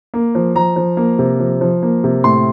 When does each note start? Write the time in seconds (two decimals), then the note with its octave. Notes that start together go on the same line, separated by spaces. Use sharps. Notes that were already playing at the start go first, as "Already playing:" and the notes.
0.14 A#3
0.35 F3
0.55 F3 A#5
0.76 F3
0.97 A#3
1.19 C3
1.39 F3
1.61 F3
1.82 A#3
2.04 C3
2.24 A2 C6